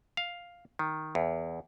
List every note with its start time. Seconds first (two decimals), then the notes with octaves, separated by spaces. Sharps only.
0.17 F5
0.79 D#3
1.15 E2